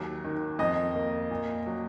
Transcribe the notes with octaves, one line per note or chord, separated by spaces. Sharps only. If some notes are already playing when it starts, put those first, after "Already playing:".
Already playing: D#2 F#3
D#3
F2 D#5
A#3
A#2
F#3